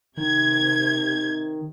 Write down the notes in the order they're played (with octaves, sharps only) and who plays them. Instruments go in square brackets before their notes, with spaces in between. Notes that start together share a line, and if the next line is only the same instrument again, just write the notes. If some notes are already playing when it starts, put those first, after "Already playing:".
[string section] C3 G#6 [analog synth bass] D#3